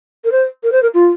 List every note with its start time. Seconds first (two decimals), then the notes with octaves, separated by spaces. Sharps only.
0.25 A#4
0.32 C5
0.63 A#4
0.72 C5
0.82 A#4
0.94 F4